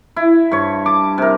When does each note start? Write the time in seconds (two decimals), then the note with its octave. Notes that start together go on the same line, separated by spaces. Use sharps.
0.16 E4
0.51 G2 C#5
0.86 A5 D6
1.18 C3 A#4